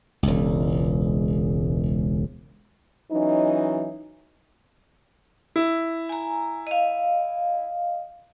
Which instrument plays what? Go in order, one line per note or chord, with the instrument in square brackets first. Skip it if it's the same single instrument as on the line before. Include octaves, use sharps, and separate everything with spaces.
[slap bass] E1 C#2
[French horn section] E3 F#3 C#4 D#4
[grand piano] E4
[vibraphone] G#5 A#5
D#5 F5